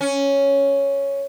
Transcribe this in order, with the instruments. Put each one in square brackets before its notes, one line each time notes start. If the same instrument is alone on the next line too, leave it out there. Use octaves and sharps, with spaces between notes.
[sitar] C#4